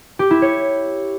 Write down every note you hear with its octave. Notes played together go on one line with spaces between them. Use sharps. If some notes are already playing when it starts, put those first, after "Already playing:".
G4
E4
C#5